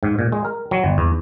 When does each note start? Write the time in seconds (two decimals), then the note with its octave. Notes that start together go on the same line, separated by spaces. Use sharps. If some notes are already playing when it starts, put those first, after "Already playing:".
0.03 G#2
0.19 A#2
0.32 G#3
0.45 A#4
0.71 F#3
0.84 G1
0.98 E2